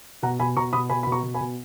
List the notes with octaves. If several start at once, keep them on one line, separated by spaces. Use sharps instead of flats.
B2 F#5 A#5
B2 G#5 B5
B2 A#5 C#6
B2 B5 D#6
B2 G#5 B5
B2 B5
A#5 C#6
B2
G#5 B5
B2